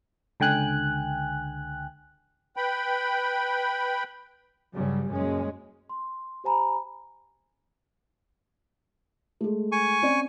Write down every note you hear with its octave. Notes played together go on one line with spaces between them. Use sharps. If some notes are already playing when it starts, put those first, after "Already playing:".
C#2 D3 G5 G#5 F#6
B4 G5 B5
G2 C#3 F#3 G3
F#1 F#2 A#2 G#3 C#4
C6
G4 C5 G#5 A#5 B5
G#3 A3
G#5 C#6
C4 C#4 D5